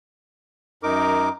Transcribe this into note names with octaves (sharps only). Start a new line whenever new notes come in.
F#2 D#4 A#4 D6